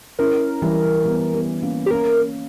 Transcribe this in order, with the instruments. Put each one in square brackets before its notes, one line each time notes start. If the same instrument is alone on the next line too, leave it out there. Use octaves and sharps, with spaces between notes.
[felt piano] C#4 E4 [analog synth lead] A#4
[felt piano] E3 G3
G3 B3
G3 B3
A#3 C#4
[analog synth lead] G4
[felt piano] A#3 C#4 [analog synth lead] A#4